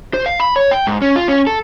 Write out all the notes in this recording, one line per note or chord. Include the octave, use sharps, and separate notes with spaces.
C5
F5
B5
C#5
G5
G#2
C#4
F4
C#4
A4